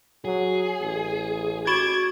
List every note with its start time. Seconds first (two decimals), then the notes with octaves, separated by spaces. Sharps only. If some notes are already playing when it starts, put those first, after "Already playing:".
0.25 F#3 G#4
0.82 A1
1.67 F#4 C#6 D6 G#6 E7